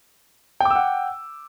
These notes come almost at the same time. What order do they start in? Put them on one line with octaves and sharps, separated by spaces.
G5 D6 E6 F#5